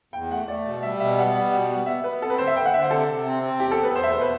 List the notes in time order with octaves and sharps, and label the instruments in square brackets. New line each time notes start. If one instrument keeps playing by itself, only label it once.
[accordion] E2 [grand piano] G5
[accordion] A3 [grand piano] F#5
[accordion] A3 [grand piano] D5
[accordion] B2
[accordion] G3 [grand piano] E5
[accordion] B2 [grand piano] E5
[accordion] B3 [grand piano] F#5
[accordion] G3
B2
B3
[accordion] B3 [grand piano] E5
[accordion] B3 [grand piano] B4
[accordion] C4 [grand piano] A4
[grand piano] B4
[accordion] D3 [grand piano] C5
[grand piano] E5
[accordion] D3 [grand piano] G5
[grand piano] F#5
[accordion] D3 [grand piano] E5
[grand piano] C5
[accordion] C3 [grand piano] A4
[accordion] C3
C4
C4
[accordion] E2 [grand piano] G4
[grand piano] A4
[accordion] B3
[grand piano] B4
[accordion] E2 [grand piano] C5
[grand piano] E5
[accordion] B2 [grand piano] C5
[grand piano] B4